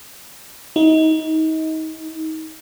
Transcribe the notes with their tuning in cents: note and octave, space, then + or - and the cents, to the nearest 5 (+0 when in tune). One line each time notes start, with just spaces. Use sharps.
D#4 +30